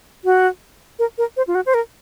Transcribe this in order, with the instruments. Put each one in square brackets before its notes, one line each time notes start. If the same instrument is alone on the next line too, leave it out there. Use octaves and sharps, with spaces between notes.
[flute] F#4
A#4
A#4
C5
F4
F#4
C5
A#4